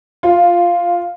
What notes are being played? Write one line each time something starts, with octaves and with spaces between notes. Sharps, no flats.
F4